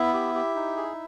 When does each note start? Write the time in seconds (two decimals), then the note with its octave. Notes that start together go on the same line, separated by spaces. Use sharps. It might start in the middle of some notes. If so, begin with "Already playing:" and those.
Already playing: B3 E4 E5
0.14 G4
0.35 G4
0.55 D#4
0.76 G#4